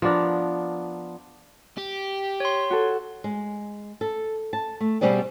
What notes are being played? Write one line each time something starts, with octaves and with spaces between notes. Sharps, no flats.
F3 B3 D4 A#4
G4
C#5 C6
F#4 A4
G#3
A4
A5
A3
B2 F3 G3 C4 G#4 D5